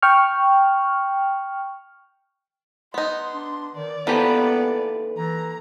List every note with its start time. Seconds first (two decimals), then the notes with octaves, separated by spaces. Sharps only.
0.02 G5 C#6 F6
2.94 B3 D#4 C6
3.34 D4
3.75 D#3 D5
4.07 D#2 E3 F3 B3 G4 A4 B4
5.18 E3 A#5